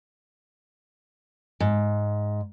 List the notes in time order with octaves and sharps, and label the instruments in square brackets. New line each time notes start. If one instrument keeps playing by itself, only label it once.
[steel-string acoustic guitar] G#2